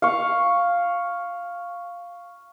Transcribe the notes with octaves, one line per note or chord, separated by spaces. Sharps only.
F5 C#6